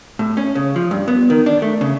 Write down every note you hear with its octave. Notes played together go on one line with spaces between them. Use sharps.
A2
C#4
C#3
F3
G2
B3
D#3
D4
A3
C#3